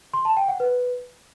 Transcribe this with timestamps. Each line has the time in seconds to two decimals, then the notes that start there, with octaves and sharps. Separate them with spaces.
0.13 C6
0.25 A5
0.37 G5
0.48 F#5
0.60 B4